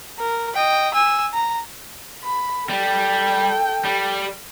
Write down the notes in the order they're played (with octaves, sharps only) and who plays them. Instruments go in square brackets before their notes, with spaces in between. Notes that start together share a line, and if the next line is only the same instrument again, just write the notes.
[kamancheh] A#4
D#5 G5
G#5 E6
A#5
B5
[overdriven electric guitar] G3 [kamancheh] A4 G5
[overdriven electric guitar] G3